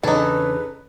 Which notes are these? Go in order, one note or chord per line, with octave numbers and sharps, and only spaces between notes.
E2 C#3 D4 D#4 A4 B4